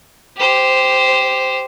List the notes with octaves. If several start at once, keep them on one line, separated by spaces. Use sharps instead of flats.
G4 C5